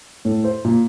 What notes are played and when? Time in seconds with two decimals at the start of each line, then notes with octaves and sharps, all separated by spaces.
0.25 A2
0.44 C5
0.65 A#2